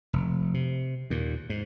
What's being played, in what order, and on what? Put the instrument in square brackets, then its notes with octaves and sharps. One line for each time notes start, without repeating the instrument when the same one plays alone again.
[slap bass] F1
C3
D#2 A#2
G#2